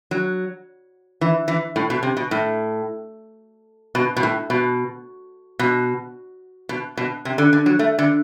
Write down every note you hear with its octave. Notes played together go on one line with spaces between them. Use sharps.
F#3
E3
E3
A2
B2
C3
B2
A2
B2
B2
A2
B2
B2
B2
B2
C3
D3
D3
F#3
A3
D3